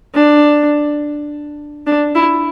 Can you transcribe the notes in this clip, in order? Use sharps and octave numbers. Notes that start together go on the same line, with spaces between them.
D4
D4
E4